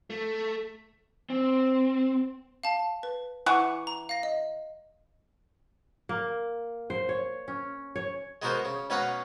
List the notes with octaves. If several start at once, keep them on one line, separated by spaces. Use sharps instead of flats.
A3
C4
F5 A5
B4
E3 F#5 C#6 D6
A#5
F5 A#6
D#5
A#3
C5
C#5
C#4
C#5
G#3 B3 F#4 A#4 C5
C#3
B2 C#4 B4 F5 F#5 A#5